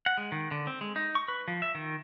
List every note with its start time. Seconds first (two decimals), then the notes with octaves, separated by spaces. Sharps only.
0.06 F#5
0.17 G#3
0.32 D#3
0.51 D3
0.67 C4
0.81 G#3
0.96 D#4
1.15 C#6
1.28 B4
1.48 F3
1.62 E5
1.75 D#3